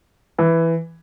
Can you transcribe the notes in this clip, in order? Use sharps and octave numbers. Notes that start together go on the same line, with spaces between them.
E3